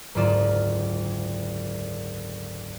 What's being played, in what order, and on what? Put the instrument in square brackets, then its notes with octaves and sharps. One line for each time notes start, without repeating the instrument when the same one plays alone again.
[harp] F#1 D2 G#2 F4 D5 E7